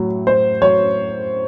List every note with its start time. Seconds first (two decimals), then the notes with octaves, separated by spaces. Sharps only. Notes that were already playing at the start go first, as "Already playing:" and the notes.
Already playing: A2 F#3
0.27 A2 C5
0.62 F#3 C#5